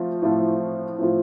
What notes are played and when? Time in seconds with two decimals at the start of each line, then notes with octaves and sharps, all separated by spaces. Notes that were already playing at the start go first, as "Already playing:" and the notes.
Already playing: F3 A3 C4 F4
0.22 A2 F3 A3 C4 F4
0.98 A2 F3 A3 C4 F4